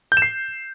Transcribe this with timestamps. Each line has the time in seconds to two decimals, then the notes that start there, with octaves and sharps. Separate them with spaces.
0.12 G6
0.17 E7
0.22 C7